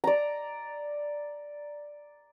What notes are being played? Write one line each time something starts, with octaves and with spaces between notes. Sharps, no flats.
D5 A#5